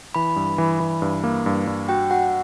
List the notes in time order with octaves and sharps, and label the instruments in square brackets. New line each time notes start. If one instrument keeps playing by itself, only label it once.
[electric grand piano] E3 [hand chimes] B5
[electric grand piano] G2
E3
E3
G2
A#3
G2
G2
[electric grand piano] F#4 [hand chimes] G5
[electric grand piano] F#4 [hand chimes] F#5